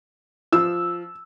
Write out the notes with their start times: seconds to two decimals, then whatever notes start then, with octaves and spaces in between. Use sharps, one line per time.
0.53 F3 E6